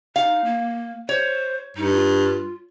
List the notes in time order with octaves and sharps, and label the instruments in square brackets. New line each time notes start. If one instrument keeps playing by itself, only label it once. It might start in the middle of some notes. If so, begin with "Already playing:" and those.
[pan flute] D#4 [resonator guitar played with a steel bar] F5
[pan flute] A#3
[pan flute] C5 [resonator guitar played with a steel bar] C#5
[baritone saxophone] G2 [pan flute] D#4
[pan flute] F4